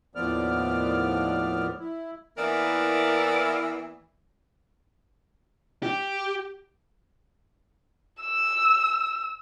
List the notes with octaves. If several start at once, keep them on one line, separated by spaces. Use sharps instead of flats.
D#2 A2 F3 B3 D5 F6
E4
E3 A#3 B3 E4 A#4 D5
G4
E6